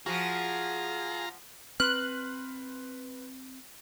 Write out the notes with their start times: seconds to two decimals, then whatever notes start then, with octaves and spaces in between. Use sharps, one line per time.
0.06 F3 F4 F#4 G#4 A#5
1.80 C4 B4 C6 F6 F#6